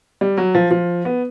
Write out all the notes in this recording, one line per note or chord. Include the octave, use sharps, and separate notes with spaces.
G3
F#3
F3
F3
B3